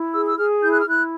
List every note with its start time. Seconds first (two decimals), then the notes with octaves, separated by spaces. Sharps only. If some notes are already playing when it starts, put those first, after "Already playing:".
Already playing: E4
0.13 G#4 E6
0.27 E6
0.37 G#4 F6
0.62 E4 G6
0.71 F#6
0.80 F6
0.86 E4 F#6